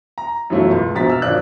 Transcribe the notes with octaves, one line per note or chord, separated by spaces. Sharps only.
A#5
F#2 B2 E3 F#3 A3 F4
C#2
A#1 B2 F3 A#5 A6 B6
E6 F6
G#1 F#3 F4 D5 F#6